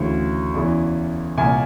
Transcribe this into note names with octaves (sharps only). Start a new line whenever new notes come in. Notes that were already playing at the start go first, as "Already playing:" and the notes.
Already playing: D2 C#3 E3
E2 C#3 E3
C2 A#2 G#5